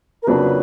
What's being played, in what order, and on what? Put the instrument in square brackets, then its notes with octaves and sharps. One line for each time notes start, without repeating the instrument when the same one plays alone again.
[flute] A#4
[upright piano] F2 C#3 F#3 A#3 D4 [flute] B4